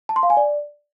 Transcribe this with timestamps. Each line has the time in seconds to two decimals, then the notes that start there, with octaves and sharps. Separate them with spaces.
0.09 A5
0.16 C6
0.23 F5
0.30 G#5
0.37 D5